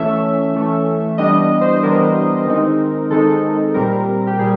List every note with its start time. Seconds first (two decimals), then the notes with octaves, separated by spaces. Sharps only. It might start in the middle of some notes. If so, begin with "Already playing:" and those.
Already playing: E3 A3 C#4 E5
0.54 E3 A3 C#4
1.18 E3 G3 B3 D4 D#5
1.61 C5
1.83 E3 G3 B3 D4 A#4
2.47 D#3 G#3 C4 D#4
3.10 D#3 G#3 C4 D#4 A4
3.74 A#2 G3 C4 A#4
4.27 G4
4.39 A#2 G3 G#4